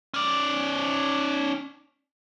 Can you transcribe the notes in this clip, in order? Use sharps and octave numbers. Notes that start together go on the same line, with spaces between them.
C#4 D5